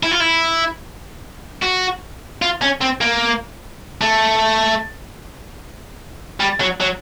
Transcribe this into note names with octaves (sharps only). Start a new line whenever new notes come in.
E4
F4
E4
F#4
F4
C#4
C4
A#3
A3
G3
F#3
F#3